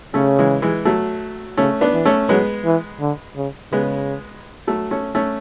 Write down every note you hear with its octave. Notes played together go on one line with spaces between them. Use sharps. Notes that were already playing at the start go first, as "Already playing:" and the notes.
C#3 A3 C#4
E3 G#3
E3 G#3
F#3 A3
C#3 A3 C#4
B3 D4
E3
A3 C#4
F#3 G#3 B3
E3
D3
C#3
C#3 G#3 B3
F#3 A3
A3 C#4
A3 C#4